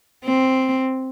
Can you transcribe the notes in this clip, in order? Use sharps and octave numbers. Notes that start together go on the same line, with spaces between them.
C4